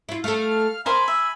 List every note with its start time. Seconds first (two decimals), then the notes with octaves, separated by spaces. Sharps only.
0.09 E4 F4
0.24 A3 A4 F5 F6
0.86 A#4 C5 D#5 F5 G#5 B5
1.08 E5